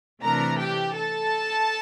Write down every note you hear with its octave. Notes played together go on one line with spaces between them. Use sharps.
C3 E3 A3 D4 A#4 A#5
G4 G5
A4 A5